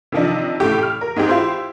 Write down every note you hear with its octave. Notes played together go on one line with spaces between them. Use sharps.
C3 D#3 F3 D4 D#4
A2 C#3 A3 G4
F6
A#4
G#2 G#3 C4 G4
E4 F4 G4 C5